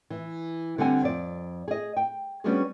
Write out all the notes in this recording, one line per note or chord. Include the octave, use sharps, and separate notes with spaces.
E3
D3 G3 C4 F#5 G#5
F2 D5
G#4 D#5
G5
G3 B3 C#4 D4 F#4 G#4